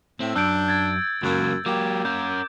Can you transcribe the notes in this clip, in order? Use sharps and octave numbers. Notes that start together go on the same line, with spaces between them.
A2 C4
F#2 D4 E6 G6 D7
G#6 A6
C#2 F#2 A#3
F#3 A#3 G4 D6
C#4 A#4 G6